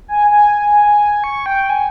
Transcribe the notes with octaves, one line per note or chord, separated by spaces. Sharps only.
G#5
G#5
C#6
G5
G#5